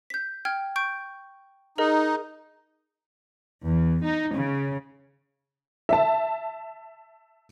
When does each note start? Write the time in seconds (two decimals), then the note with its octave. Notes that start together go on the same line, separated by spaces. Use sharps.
0.10 G6 B6
0.45 G5 F6 G#6
0.76 C#6 G6 D7
1.78 D#4 G#4 A#4 D#5
3.65 E2
4.03 D#4
4.36 C#3
5.89 E5 A5